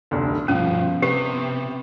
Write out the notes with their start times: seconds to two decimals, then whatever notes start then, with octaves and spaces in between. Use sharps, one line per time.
0.11 F1 D2
0.48 G2 B2 F3 C#4
1.02 C3 B3 G4